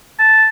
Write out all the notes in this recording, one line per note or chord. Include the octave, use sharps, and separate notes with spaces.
A5